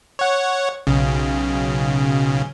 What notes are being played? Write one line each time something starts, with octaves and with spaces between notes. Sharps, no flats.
C#5 F#5
B1 C#3